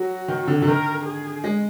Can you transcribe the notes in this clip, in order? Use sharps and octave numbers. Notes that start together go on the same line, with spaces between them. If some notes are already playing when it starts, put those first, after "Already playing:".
Already playing: F#3 F#4
D#3
D3
D3
D#3 A#4
G#4
G#3